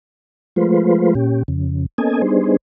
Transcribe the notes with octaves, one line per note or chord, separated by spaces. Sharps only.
F3 G#3 A3 F4 B4 C5
A#2 C#4 G4
F2 C#3
A#3 B3 C#4 A4 D#5 G#5
G3 B3 D4 D#4 G#4 C5